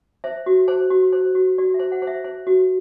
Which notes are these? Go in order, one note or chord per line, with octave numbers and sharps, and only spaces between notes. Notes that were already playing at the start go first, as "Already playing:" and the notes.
C5 E5
F#4
C5
F#4
C5
F#4
F#4 D5
E5
C5
F#5
C5
E5
C5
F#4